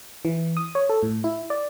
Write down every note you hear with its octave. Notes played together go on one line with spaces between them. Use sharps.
E3
D#6
C#5
A4
A2
E4
D5